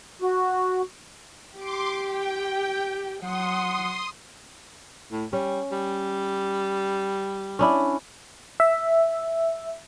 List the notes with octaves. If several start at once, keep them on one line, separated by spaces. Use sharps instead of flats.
F#4
G4 C6 D6
G5
F#3 F#5 C6 D#6
A2
G3 C#4
G3
C#4 D4 E4
E5